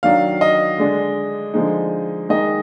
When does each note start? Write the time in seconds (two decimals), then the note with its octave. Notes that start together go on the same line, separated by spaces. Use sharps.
0.03 D#3 F#3 D4 F5
0.41 D#5
0.78 D3 G#3 D4
1.54 D3 F3 G#3 D#4
2.29 D#3 G#3 D#4 D#5